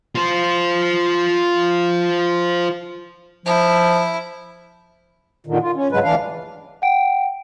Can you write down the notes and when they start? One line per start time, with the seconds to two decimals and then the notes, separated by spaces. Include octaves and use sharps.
0.15 F4 C5
3.46 F3 E4
5.47 A#2 D3 D#3
5.62 F4
5.76 C#4
5.92 G#2 C#3 F#3 G#3 B4
6.04 D2 E3 D4 F5
6.82 F#5 G5 D7